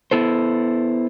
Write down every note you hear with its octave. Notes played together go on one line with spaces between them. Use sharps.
B3 E4 A4 C5